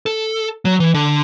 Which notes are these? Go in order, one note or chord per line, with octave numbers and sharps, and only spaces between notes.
A4
F#3
E3
D3